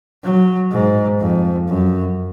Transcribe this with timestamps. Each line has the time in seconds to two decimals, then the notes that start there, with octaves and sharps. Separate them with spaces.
0.24 F#3
0.72 G#2
1.20 F2
1.68 F#2